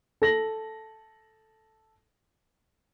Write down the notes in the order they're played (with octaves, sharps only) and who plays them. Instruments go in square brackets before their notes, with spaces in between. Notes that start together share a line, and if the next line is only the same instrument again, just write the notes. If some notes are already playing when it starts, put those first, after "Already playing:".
[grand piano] A4 A#6 F#7